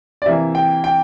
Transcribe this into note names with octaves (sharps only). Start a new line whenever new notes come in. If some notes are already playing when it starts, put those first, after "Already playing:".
D5
C3 E3 A#3 E5
G5
G5